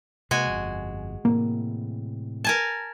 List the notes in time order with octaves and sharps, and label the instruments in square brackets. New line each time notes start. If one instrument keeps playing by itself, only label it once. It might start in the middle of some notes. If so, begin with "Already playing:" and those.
[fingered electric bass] C3 A#3 [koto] G#3 F#4 G#5
[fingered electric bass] G1 F2
[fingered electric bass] A2 C3 E3 [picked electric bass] A#3
[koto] A#4 G#5 A5